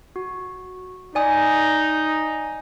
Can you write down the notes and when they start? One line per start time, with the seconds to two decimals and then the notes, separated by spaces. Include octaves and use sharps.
0.16 F#4
1.15 D#4 D5 G#5 D#6